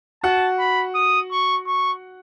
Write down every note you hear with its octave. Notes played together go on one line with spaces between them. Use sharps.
F#4 F#5 A5
B5
D#6
C#6
C#6